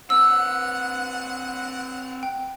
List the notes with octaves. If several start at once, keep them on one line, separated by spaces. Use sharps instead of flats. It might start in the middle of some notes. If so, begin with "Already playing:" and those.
C4 B4 F#5 E6
G5